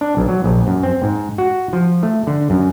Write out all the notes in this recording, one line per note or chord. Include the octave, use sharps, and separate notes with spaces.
D4
B1
F#3
A#1
F#2
C4
G#2
F#4
F3
A3
D3
F#2